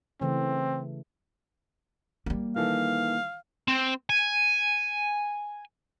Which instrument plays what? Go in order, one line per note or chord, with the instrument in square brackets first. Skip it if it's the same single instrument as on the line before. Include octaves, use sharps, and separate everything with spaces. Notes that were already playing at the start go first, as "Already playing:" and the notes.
[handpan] C#3 E3 A3 [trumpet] C4
[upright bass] G3 A#3
[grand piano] D#3 E3 A4 [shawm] F5
[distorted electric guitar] C4
G#5